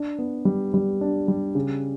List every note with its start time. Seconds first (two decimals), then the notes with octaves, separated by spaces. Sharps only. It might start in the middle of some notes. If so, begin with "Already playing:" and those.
Already playing: D4
0.19 B3
0.45 G3
0.74 G3
1.01 D4
1.28 G3
1.55 C#3